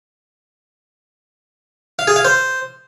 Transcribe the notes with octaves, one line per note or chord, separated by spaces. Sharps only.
F5
G#4
F5
C5